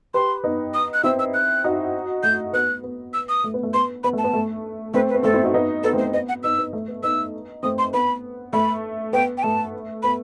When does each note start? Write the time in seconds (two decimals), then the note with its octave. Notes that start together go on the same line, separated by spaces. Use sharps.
0.14 G4 B4 C6
0.44 B3 D#4
0.74 D#6
0.94 F#6
1.03 C4 E4 E6
1.19 E6
1.34 F#6
1.64 D#4 F#4
2.23 A3 G6
2.53 B3 F#6
2.84 B3
3.14 E6
3.29 D#6
3.44 A3
3.54 B3
3.63 A3
3.74 B3 C6
4.04 B3 B5
4.13 A3 A5
4.24 B3
4.33 A3
4.94 A3 C4 B4
5.09 B4
5.15 B3
5.23 A3 C4 A4
5.34 C4 E4
5.43 D#4 F#4
5.54 B3 D#4
5.83 B3 D#4 A4
5.93 A3 C4
5.98 C5
6.03 A3
6.13 B3 D#5
6.29 F#5
6.43 B3 D#4 E6
6.59 B3
6.73 A3
6.88 B3
7.03 B3 D#4 E6
7.63 A3 C4 D#6
7.78 C6
7.94 B3 B5
8.53 A3 B5
9.13 B3 G5
9.38 G5
9.43 A3 A5
10.03 B3 B5